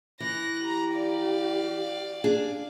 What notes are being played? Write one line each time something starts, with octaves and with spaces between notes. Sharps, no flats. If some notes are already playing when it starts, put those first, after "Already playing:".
E3 F#6 A#6
G4 A#5
D5 F5
D4 G#4